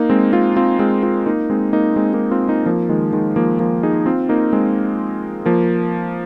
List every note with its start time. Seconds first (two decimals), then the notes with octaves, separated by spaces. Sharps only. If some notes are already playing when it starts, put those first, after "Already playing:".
Already playing: A#3 D#4
0.10 G#3 C4
0.33 C4 F4
0.57 C4 F4
0.79 G#3 C4
1.03 C4 F4
1.26 A#3 D#4
1.50 G#3 C4
1.73 A#3 D#4
1.96 G#3 C4
2.13 A#3 D#4
2.31 C4 F4
2.49 A#3 D#4
2.66 F3 A#3
2.89 D#3 G#3
3.13 D#3 G#3
3.36 F3 A#3
3.60 F3 A#3
3.83 D#4 G#4
4.06 C4 F4
4.29 A#3 D#4
4.53 G#3 C4
5.46 F3 A#3